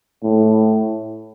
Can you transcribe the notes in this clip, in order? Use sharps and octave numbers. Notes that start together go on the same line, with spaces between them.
A2